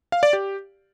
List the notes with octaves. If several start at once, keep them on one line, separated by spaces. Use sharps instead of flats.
F5
D5
G4